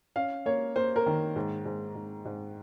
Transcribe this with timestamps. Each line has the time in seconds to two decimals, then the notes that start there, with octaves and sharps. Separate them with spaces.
0.16 C#4 F5
0.46 A#3 C#5
0.76 A#3 C5
0.96 A#4
1.06 D#3
1.36 G#2
1.65 G#2
1.95 G#2
2.25 G#2